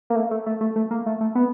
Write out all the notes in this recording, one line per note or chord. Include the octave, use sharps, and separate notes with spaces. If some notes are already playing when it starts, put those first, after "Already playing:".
A#3
A3
A3
A3
A3
A3
A#3
A3
A3
B3